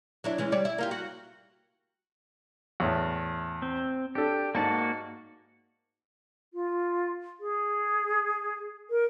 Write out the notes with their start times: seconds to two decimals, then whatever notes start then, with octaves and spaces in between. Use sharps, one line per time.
0.24 F#3 D4 E4
0.38 E3 G#3 C#4
0.52 G3 C#5 D5
0.65 E4
0.78 A#3 F4 G4
0.91 F#4
2.80 E2 A2
3.62 C4
4.15 D4 G4 A4
4.55 G#2 A#3 F#4 D5 A5
6.53 F4
7.40 G#4
8.90 A#4